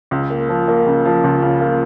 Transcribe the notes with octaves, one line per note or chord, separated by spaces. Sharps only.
C#2
A#3
F3
A#3
C#3
F3
C#2
C#3
A#3